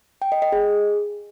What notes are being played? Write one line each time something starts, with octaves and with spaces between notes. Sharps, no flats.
G5
D#5
D#5
G#4